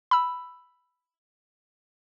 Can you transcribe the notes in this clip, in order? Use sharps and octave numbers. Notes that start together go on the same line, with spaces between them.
B5 E6